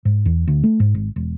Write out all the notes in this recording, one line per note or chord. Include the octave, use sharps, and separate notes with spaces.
G#2
E2
D2
A3
G#2
G#1
E1